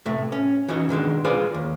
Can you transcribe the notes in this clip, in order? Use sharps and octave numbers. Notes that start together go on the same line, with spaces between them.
A2 C3 A3
C#4
E3 C#4 D#4 F#4 D#5
B2 D#3 G#3 D4
G#3 F4 G#4 B4 C5 D5
D#2